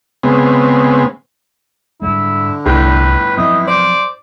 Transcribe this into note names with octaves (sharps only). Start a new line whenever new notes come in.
C#3 G#3 B3 C4
G#2 D3 G3 G#3 E4
G1 C2 A2 B4
F3 F#3 C4 E4 D#5
C5 D5